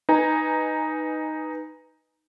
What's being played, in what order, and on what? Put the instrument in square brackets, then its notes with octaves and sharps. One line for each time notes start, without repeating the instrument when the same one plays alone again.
[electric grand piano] D#4 B4 G#5 A#5